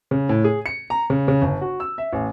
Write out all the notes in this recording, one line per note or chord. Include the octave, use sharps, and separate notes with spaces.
C#3
A2
G#4
C#7
A#5
C#3
C#3
G1
F#4
E6
E5
A1